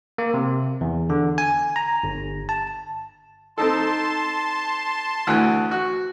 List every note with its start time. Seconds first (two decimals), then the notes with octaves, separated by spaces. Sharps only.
0.18 A#3
0.34 C3
0.81 E2
1.10 D3
1.38 G#5
1.76 A#5
2.03 G1
2.49 A5
3.58 C4 D#4 A4 A5 C6
5.27 D2 E3 F#6
5.71 F#4